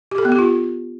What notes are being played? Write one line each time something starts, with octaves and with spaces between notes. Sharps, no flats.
G4
A4
B3
G4
F4